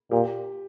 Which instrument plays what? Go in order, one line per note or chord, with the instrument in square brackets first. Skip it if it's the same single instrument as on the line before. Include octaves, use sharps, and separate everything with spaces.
[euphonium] A#2 [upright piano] G4